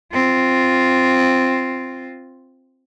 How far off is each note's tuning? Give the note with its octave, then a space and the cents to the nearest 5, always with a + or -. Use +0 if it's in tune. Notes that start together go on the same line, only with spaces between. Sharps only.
C4 +0 F4 +0